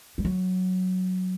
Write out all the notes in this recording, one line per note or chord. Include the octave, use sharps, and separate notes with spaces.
G3
F#3